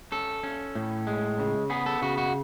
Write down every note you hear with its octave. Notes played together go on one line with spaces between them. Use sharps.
C#4 A4
C#4
A2
G#3
C#3
B3 G#4
A4
C#3 F#4
F#4